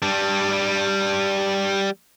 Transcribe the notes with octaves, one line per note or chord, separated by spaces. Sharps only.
G3 D4